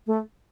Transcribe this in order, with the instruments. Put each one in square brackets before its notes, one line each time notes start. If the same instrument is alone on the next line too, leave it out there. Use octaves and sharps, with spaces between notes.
[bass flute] A3